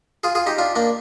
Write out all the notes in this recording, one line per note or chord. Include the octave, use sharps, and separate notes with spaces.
F4 G#4
F4 G#4
D#4 G4
D4 F4
A#3 D4